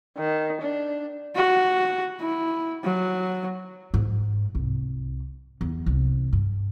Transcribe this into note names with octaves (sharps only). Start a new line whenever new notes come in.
D#3
D4
F#4
E4
F#3
G#2
C2
E2
C2
G2